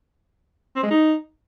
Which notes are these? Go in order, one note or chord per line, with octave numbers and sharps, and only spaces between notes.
C4
G#3
D#4